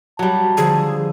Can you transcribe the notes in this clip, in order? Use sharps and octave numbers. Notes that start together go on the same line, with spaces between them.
F#3 G3 A5
D3 F3 G#4